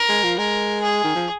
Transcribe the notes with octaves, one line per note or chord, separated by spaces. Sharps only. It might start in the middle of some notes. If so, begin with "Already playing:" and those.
Already playing: A#4
G#3
F3
G#3 A#4
G#4
D#3
F3